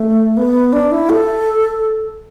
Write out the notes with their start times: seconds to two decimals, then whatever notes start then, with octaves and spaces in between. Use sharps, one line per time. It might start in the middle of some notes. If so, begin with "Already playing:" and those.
Already playing: A3
0.37 B3
0.73 D4
0.92 E4
1.10 A4